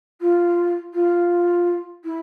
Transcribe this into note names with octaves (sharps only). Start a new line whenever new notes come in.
F4
F4
E4